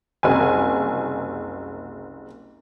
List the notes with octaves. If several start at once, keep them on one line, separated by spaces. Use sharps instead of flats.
F#1 C2 G#5